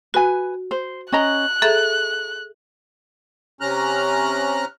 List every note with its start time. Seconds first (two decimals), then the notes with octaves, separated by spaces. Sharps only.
0.14 F#4 B4 G#5
0.71 C5
1.12 C#4 D#5 A#5 F#6
1.62 G#4 A4 E5 A#5
3.61 C3 C#4 A#5 F6 F#6